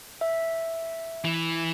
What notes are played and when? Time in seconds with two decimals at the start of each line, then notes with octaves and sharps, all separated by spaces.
0.21 E5
1.25 E3